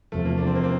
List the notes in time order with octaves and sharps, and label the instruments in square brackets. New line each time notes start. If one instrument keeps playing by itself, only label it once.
[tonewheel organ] E2 C3 F3 [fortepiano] A3
[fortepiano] A#3
D4
C4
A#3
C4